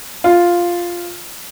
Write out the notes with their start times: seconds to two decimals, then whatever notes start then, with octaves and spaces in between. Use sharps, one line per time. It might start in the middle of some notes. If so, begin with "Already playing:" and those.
0.24 F4